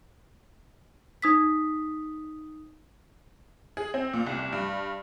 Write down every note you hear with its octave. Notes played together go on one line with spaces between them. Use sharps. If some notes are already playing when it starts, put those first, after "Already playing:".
D#4 D#6 B6
G#4
C4
A#2
C2
C2
G2